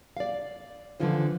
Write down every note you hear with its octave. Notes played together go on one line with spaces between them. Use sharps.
D5 F5
D3 E3 F3 C#4 F4 C5